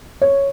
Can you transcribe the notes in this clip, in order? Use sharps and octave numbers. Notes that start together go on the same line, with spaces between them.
C#5